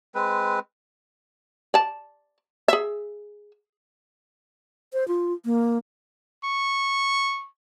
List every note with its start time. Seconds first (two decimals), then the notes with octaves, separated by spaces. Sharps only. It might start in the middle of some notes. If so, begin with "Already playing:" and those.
0.15 G#3 C4 B4
1.74 D5 A5
2.68 G#4 E5
4.93 C5
5.08 F4
5.45 A#3
6.44 C#6